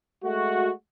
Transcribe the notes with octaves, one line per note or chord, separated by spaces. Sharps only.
G#3 A3 F#4